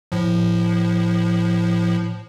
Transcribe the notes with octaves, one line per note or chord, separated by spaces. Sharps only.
A2 F3